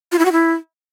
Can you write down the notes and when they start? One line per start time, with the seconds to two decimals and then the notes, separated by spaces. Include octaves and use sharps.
0.12 F4
0.18 E4
0.25 F#4
0.32 E4